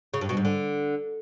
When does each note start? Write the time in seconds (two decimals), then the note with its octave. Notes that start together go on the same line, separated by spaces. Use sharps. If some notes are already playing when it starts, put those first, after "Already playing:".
0.14 C#3
0.21 G2
0.29 B2
0.37 G#2
0.45 D3